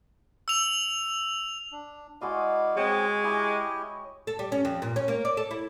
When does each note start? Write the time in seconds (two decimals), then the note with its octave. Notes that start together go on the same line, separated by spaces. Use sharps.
0.48 E6 F7
1.72 D4
2.21 G#3 E4 F#4 D5 D#5 F5
2.77 G#3 C4 C#5 G5
3.24 E4 G4 D#5 G#5
4.27 A4
4.39 G3
4.52 C#4
4.65 F2
4.82 A#2
4.96 C#4
5.08 A#3
5.25 D5
5.37 A4
5.51 E4